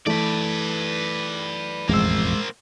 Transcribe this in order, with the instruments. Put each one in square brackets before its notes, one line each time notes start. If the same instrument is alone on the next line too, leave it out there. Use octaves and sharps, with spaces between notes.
[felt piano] E3 A3 [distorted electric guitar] B4 D5
[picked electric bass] E1 A1 F2 [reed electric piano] G#3 E6 [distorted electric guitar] A#3 C5